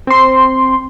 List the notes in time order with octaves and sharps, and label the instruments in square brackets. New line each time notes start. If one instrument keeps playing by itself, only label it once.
[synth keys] C4 C6